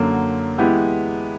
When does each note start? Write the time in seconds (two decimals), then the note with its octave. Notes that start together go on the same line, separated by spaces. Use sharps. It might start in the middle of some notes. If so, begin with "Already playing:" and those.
Already playing: F#2 D3 F#3 A#3
0.58 E3 G#3 B3 E4 G4